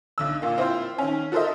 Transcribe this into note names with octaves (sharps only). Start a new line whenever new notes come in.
B1 D3 E6
A#2 A#3
C4 E4 F4 C5
D#3 C#4
F#4 A4 A#4 C5 D#5 E5